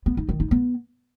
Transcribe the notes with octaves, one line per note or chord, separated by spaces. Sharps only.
B3
D#4
D#3
D#4
B3